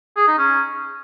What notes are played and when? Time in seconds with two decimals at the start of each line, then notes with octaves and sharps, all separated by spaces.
0.17 G#4
0.27 D#4
0.38 C#4